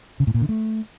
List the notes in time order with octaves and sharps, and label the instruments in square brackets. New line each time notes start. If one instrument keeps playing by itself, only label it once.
[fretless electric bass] C#3
A2
A#2
D3
A3